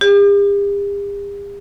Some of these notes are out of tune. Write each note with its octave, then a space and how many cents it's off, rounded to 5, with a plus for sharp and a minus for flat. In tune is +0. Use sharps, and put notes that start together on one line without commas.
G4 +45